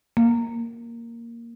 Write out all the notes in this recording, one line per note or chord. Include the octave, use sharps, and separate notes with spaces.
A#3